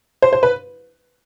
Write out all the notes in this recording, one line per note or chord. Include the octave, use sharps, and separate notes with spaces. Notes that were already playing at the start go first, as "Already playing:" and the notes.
C5
C5
B4